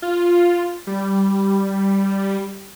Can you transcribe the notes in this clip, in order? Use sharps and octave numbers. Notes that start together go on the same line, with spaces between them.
F4
G3